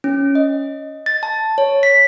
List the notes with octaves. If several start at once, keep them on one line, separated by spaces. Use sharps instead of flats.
C#4
D#5
A6
A5
C#5
B6